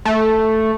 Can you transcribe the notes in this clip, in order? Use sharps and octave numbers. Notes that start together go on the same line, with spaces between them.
A3